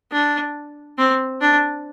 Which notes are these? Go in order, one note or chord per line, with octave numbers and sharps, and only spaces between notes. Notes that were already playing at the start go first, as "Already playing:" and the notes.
D4
C4
D4